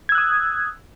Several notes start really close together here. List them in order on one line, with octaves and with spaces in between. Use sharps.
G#6 E6 F#6 D#6